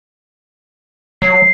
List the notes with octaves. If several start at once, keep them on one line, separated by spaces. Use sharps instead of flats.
F#3 C7